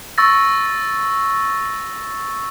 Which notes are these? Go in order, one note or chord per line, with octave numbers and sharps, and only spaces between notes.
C#6 E6 A6 A#6